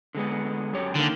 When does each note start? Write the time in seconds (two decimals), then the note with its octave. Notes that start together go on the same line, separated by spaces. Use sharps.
0.15 D3 G#3 B3
0.73 F#2 G4 C#5
0.95 D3 D#3 A#3